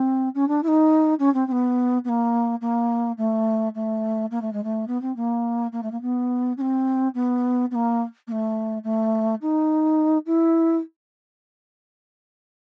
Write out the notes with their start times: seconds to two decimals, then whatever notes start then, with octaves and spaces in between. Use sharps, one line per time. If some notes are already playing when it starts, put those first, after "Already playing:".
Already playing: C4
0.35 C#4
0.48 D4
0.63 E4
0.67 D#4
1.19 C#4
1.34 C4
1.47 C4
1.52 B3
2.04 B3
2.08 A#3
2.61 A#3
3.17 A3
3.74 A3
4.31 A#3
4.41 A3
4.52 G#3
4.63 A3
4.87 B3
5.01 C4
5.16 A#3
5.72 A#3
5.82 A3
5.91 A#3
6.01 B3
6.57 C#4
6.61 C4
7.14 B3
7.71 B3
7.75 A#3
8.27 A#3
8.31 A3
8.84 A3
9.41 D#4
10.26 E4